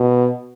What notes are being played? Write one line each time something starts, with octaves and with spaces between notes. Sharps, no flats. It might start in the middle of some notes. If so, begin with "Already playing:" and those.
Already playing: B2